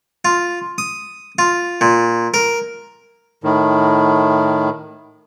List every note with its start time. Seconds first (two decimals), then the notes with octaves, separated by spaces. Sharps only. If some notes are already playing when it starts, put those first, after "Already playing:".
0.25 F4
0.78 D#6
1.39 F4
1.81 A#2
2.34 A#4
3.44 A2 D#3